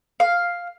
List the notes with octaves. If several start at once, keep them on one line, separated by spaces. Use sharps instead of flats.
F5